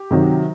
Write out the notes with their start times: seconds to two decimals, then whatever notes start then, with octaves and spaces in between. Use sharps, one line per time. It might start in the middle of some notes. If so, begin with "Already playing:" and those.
Already playing: G4
0.11 C3 D#3 F#3